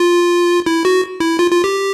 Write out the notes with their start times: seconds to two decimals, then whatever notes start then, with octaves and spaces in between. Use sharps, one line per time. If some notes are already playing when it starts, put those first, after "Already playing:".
Already playing: F4
0.66 E4
0.85 F#4
1.20 E4
1.39 F4
1.51 F4
1.64 G4